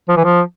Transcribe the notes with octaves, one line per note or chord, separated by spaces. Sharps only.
F3
E3
F3